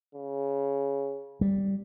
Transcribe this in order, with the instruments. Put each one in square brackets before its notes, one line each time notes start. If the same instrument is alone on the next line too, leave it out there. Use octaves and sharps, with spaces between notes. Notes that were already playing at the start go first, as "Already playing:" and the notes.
[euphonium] C#3
[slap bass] G3